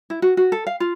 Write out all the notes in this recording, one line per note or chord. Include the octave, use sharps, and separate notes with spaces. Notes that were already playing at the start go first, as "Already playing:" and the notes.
E4
F#4
F#4
A4
F5
F4